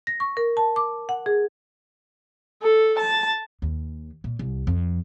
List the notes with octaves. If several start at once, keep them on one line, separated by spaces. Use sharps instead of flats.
A#6
C#6
A#4
A5
D6
F#5
G#4
A4
A5
D#2
A#2
C2
F2